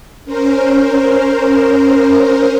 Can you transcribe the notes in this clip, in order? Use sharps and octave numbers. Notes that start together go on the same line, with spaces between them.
C#4 A#4 C5